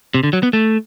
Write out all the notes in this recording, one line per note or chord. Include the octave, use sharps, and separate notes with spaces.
C3
D3
F#3
B3
A3